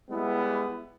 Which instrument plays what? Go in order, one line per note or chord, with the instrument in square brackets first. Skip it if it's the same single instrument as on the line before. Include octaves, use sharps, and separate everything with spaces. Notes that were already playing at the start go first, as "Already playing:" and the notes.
[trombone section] G3 G#3 B3 [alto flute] E4